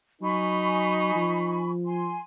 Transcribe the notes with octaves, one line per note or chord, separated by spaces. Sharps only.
F#3 D#4 G#5 B5 C#6
F3
G#5 C6